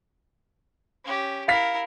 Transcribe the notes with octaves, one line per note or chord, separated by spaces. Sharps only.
C#4 G4
E4 A#4 F5 B6